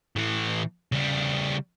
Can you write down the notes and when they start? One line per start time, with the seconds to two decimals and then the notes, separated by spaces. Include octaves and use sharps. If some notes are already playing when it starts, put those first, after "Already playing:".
0.16 A2 E3
0.92 C#3 G3